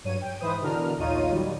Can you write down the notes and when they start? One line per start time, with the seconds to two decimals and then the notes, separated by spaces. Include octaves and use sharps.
0.04 G2 F#3 C#5 D#7
0.22 G5
0.41 G#2 E3 B4 C5 D#6
0.61 B2 D3 E3 D4 A#4 F6
0.99 A#1 D#2 D#4 F4 C#5 D#7
1.31 D#3 F#3 G3